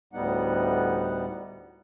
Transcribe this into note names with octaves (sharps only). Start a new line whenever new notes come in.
D2 A2 G3 B3 D#4 F#5